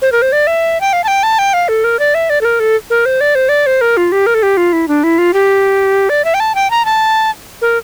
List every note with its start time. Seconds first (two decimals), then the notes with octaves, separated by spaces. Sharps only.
0.02 C5
0.12 A#4
0.22 C5
0.32 D5
0.47 E5
0.81 G5
0.93 F5
1.04 A5
1.08 G5
1.23 A5
1.39 G5
1.54 F5
1.69 A4
1.84 A#4
1.99 D5
2.15 E5
2.30 D5
2.41 A4
2.45 A#4
2.60 A4
2.90 A#4
3.06 C5
3.21 D5
3.35 C5
3.49 D5
3.66 C5
3.81 A#4
3.97 F4
4.12 G4
4.26 A#4
4.35 A4
4.43 G4
4.57 F4
4.73 E4
4.88 D4
5.04 E4
5.18 F4
5.34 G4
6.09 D5
6.25 E5
6.34 G5
6.40 A5
6.55 G5
6.71 A#5
6.85 A5
7.62 A#4